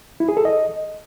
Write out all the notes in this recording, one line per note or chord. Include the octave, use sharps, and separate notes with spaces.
E4
G#4
A4
D#5